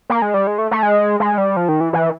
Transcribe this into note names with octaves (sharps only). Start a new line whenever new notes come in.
A#3
G#3
G3
G#3
A3
A3
G#3
G#3
G3
F3
D#3
E3
E3